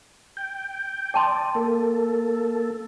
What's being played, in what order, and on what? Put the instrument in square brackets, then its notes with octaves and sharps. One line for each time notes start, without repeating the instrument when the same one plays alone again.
[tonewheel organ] G5
[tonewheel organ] D5 [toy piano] G5 A5 C6
[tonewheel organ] A#3 A4